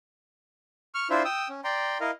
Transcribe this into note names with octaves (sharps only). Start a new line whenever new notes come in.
C#6 F6
D4 E4 F4 C5 E5
G5 D#6 E6
C#4
D5 G5 A#5 C6
E4 A#4 D#5 F5